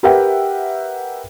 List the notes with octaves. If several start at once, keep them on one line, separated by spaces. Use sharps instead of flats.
G4 A#4 B4 E5 F#5 G5